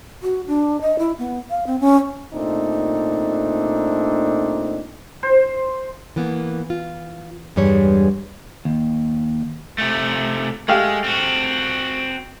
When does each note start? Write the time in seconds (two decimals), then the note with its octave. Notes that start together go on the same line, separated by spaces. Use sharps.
0.23 F#4
0.47 D4
0.81 D#5
0.99 E4
1.19 B3
1.50 F5
1.67 C4
1.80 C#4
2.34 A#2 A3 C4 D4 D#4
5.23 C5
6.16 E3 A#3 B3
6.70 F4
7.56 E2 G2 G3 G#3 C#5
8.65 D#2
9.78 C3 A3
10.68 G#3 A3 G4 F5
11.04 C4 F#4